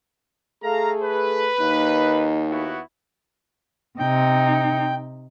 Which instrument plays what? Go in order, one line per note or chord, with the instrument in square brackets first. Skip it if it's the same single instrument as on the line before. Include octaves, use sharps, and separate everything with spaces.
[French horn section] A3 G#4 A4 [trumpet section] F5 A#5
[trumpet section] B4
[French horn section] D#2 A#3 D#4
[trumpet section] B3 E4 F#4
[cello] C3 D#4 [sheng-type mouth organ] G5